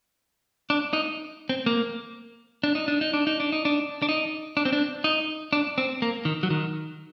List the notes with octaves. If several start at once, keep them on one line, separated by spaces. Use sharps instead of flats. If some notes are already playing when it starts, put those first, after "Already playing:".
D4
D#4
C4
A#3
D4
D#4
D4
D#4
D4
D#4
D4
D#4
D4
D4
D#4
D4
C4
D4
D#4
D4
C4
A#3
D#3
F#3
D#3